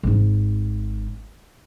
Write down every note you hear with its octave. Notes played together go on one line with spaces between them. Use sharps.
G#1 D#4